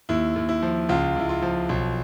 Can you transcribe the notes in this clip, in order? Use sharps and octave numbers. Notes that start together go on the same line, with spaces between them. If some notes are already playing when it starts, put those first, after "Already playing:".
D#2 E4
D#2
E4
F3
C#2 F4
C#2 E4
F4
F3
B1